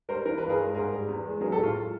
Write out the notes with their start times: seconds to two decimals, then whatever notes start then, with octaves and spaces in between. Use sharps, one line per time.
0.09 G3 A#4 C5
0.25 E3 A#4
0.38 G2 B4
0.49 G#4 A#4
0.59 G#3
0.75 G#2 G#4 A#4
0.92 G3
1.08 E2
1.25 G#3
1.41 F#3 G#4 A#4
1.52 G4 A4
1.58 A2
1.63 F4
1.75 G#3